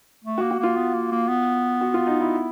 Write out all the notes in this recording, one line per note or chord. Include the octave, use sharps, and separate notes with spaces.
A3
A#3 F#4
F#4
A#3 F4
B3
A#3
A#3
B3
F#4
F4
D#4
E4